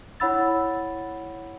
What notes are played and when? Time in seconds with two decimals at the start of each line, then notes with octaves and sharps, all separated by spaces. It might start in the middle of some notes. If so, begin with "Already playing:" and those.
0.20 E4 C#5 F#5 B5 E6 A6